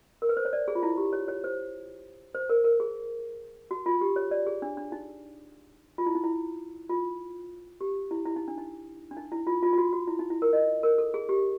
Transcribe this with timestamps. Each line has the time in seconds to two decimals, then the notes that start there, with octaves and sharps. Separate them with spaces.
0.22 A#4
0.29 B4
0.37 C5
0.45 C#5
0.53 D5
0.68 G#4
0.75 F4
0.83 E4
0.98 G4
1.13 C#5
1.28 C#5
1.44 C5
2.35 C5
2.50 A#4
2.64 A#4
2.80 G#4
3.71 F#4
3.86 F4
4.01 G4
4.16 C#5
4.31 D5
4.46 G#4
4.62 D4
4.77 D4
4.92 D#4
5.98 F4
6.06 E4
6.15 D#4
6.24 E4
6.89 F4
7.81 G4
8.11 E4
8.26 E4
8.36 D#4
8.48 D4
8.58 D#4
9.11 D4
9.17 D#4
9.32 E4
9.47 F4
9.63 F4
9.73 F4
9.78 F#4
9.93 F#4
10.08 E4
10.19 D#4
10.30 E4
10.42 A#4
10.53 D#5
10.83 A#4
10.98 A4
11.14 G#4
11.29 G4